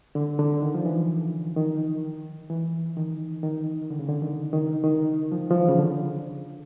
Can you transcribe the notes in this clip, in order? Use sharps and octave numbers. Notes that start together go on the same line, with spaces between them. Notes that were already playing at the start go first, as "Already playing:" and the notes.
D3
D3
D#3
F3
E3
D#3
E3
D#3
D#3
D3
C#3
D3
D#3
D#3
D#3
F3
F3
E3
C#3
D3